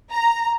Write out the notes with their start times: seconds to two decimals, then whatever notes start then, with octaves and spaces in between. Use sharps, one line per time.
0.11 A#5